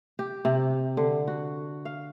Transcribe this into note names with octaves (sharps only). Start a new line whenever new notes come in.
G4
C3
D3
F#4
F5